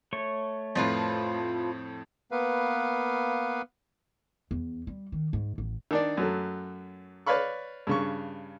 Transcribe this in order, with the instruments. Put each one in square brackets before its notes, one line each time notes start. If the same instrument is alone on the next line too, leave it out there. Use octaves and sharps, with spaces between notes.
[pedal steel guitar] A3 C#5 C#6
[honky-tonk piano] F2 A2 [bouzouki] F3 F4 B4
[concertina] A#3 B3 B4 F5
[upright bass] E2
G3
D#3
G#2
A1
[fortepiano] D#3 D4 D5
F#2 F#3 A3
B4 C#5 D5 F5 B5 C#6
G2 C#3 C#6